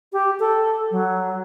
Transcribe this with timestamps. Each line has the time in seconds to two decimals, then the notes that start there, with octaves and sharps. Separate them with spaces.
0.13 G4
0.39 A4
0.91 F#3